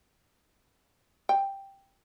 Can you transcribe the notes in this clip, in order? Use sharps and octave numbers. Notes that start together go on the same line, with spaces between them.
G5